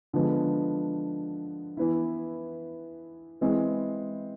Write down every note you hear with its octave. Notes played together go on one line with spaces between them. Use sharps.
D3 F3 G#3 B3
E3 B3 E4
E3 G#3 C4 E4